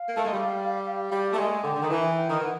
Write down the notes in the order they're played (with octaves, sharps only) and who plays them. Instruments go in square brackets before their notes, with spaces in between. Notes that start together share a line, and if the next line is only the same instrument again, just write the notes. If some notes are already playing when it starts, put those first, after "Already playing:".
Already playing: [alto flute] F5
[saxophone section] A#3
A3
G#3
G3
G3
A3
[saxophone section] G#3 [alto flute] G#5
[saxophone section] D3 [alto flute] G5
[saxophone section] D3
D#3
[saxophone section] E3 [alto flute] G#5
[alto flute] G5
[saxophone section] D#3
[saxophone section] E3 [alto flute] F#5